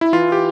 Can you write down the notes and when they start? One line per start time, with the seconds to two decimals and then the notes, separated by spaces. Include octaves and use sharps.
0.01 E4
0.13 E3 F4
0.32 G4